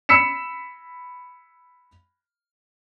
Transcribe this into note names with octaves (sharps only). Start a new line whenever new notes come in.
B5 E6 B6 C#7 E7